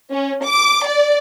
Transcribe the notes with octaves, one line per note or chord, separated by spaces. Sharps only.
C#4
D6
D5